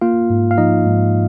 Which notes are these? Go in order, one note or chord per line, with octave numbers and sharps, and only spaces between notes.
A#3 F4 F5
G#2
F5
F3 D#4 D#5
G#2